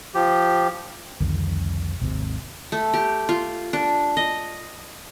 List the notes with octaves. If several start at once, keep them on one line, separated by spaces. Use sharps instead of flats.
F3 G4
C2 F2 D3 D#3
G#1 D#2 C3
A3
G4
F4
D4
D#5